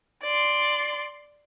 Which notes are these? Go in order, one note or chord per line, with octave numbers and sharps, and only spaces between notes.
D5 C6